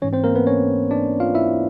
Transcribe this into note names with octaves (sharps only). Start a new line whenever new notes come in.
G#2 E3 C#4 C#5
C4 C5
A#3 A#4
B3 B4
C#4 C#5
D4 D5
F4 F5
E4 E5